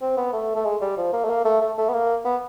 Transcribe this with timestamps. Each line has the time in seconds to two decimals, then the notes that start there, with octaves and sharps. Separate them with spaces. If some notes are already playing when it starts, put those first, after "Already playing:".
0.02 C4
0.17 B3
0.33 A3
0.56 A3
0.65 G#3
0.81 G3
0.97 F3
1.13 A#3
1.25 A3
1.30 A#3
1.45 A3
1.61 A3
1.78 A3
1.89 B3
1.93 A#3
2.25 B3